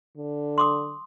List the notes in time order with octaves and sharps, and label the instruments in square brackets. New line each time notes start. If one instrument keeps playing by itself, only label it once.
[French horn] D3
[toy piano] C6 D6 D#6